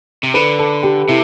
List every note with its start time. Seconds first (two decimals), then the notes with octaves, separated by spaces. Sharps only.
0.23 C3
0.34 D3 B4
0.59 A4
0.83 G4
1.08 C3 E4